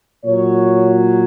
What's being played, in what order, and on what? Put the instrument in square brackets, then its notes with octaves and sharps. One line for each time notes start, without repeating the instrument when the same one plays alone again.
[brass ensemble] A#2 F#3 C#5